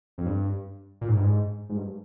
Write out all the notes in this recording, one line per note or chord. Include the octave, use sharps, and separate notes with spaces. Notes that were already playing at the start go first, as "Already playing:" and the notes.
F2
G2
A#2
G#2
G2
G#2
G#2
G2